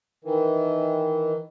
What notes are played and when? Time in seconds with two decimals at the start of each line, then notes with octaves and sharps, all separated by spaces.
0.25 D#3 E3